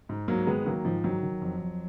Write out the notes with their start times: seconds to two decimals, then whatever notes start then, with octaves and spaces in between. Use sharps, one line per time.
0.09 G#2
0.28 G#2 F#3 A#3
0.47 D#3 G#3 B3
0.66 D#3 F#3 A#3
0.85 G#2 F3
1.04 D#3 F#3
1.23 D#3
1.41 F2
1.60 F2